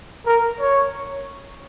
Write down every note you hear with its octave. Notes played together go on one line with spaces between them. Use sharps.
A#4
C#5